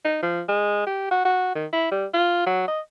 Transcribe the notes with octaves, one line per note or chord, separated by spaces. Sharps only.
D#4
F3
G#3
G4
F#4
F#4
D#3
E4
G3
F4
F#3
D#5